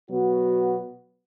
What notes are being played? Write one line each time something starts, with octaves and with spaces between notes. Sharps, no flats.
B2 F#3 B3 F#4